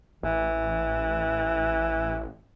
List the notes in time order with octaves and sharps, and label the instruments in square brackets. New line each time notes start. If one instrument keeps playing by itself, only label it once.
[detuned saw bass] A1 [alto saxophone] E3